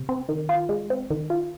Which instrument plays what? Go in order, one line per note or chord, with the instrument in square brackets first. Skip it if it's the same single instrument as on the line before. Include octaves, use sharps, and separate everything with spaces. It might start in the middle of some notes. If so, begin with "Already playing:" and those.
Already playing: [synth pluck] C3
C4
D#3
F4
G#3
C4
D#3
F4